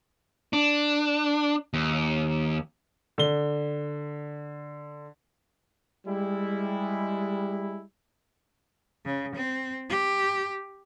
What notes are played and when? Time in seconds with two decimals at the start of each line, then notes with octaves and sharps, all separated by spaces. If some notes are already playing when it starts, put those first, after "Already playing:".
0.53 D4
1.74 D#2
3.18 D3 G7
6.06 G3 G#3 E4
9.05 C#3
9.36 C4
9.90 G4